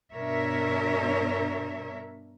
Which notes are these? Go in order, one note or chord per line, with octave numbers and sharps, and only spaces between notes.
G2 B2 D4 A#4 C#5 E5